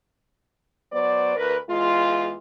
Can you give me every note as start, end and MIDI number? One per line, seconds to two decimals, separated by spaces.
0.92 1.33 54
0.92 1.33 59
0.92 1.33 72
0.92 1.33 74
1.36 1.56 38
1.36 1.56 70
1.36 1.56 71
1.69 2.36 40
1.69 2.36 56
1.69 2.36 65